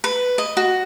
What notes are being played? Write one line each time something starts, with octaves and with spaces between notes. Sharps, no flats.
B4
D#5
F#4